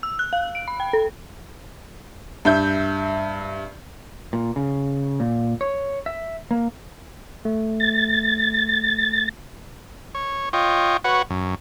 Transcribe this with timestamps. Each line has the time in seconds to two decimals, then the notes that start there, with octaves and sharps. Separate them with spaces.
0.03 E6
0.19 F#6
0.33 F5
0.55 D7
0.68 B5
0.80 G5
0.93 A4
2.45 G2 E5 G6
4.33 A#2
4.56 C#3
5.20 A#2
5.61 C#5
6.06 E5
6.51 A#3
7.45 A3
7.80 A6
10.15 C#5
10.53 F4 C#5 D#5 G5
11.04 F#4 B4 C#5 F#5
11.30 F#2